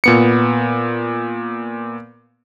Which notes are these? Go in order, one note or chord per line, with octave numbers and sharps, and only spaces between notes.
A#2 B3 C#7